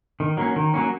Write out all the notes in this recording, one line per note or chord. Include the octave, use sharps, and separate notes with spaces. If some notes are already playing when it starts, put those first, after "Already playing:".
D#3
F#3 A#3 C#4
D#3
F#3 A#3 C#4